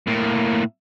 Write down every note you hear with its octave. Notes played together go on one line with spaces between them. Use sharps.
A2 A#3